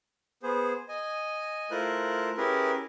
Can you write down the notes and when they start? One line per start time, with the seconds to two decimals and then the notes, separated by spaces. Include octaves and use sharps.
0.43 B3 G#4 C5
0.88 D#5 G#5
1.71 A3 E4 F4 A#4 C5 F#6
2.37 C#4 E4 G4 G#4 A#4 B4